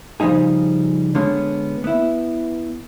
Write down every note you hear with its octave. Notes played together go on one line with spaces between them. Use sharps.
C#3 F3 G3 D#4 G#4
D3 G#3 B3 C#4
B3 E4